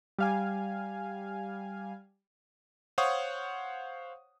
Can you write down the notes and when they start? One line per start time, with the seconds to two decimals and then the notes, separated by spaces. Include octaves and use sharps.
0.18 G3 F5 G#5
2.98 C5 C#5 F5 F#5 C#6 D#6